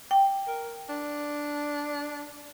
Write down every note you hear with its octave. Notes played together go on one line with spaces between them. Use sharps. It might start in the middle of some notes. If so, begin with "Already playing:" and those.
G5
A#4
D4